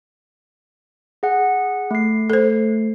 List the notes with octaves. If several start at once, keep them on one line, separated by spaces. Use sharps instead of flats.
G#4 F#5
A3 C7
A4 C5